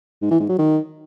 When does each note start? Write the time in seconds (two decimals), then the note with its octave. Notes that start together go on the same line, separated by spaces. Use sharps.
0.22 G#2
0.31 E3
0.40 G#2
0.49 F#3
0.58 D#3